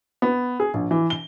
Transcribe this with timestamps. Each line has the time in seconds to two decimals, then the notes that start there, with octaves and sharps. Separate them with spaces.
0.22 B3
0.60 G#4
0.74 A#1
0.91 E3
1.10 G7